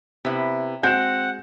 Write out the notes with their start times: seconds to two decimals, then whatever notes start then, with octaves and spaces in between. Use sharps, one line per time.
0.25 C3 B3 E4
0.83 G#3 C4 F#4 F#5 G6 E7